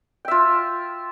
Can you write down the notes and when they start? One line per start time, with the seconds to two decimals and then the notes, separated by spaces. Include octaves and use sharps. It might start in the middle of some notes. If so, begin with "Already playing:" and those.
0.25 G5
0.28 E5
0.31 F4